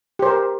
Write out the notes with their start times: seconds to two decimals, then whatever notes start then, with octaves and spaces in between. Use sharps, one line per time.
0.19 G4
0.22 C5
0.26 A#4